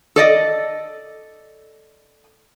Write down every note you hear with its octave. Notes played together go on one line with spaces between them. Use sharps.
A4 D5 D#5